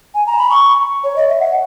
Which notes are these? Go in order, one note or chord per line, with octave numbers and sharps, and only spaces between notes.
G#5
A#5
B5
C#6
C#5
D#5
E5
F#5